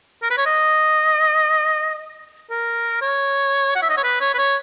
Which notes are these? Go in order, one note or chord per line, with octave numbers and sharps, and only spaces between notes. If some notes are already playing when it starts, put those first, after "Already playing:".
A#4
B4
C#5
D#5
A#4
C#5
F#5
E5
D#5
C#5
B4
C#5
B4
C#5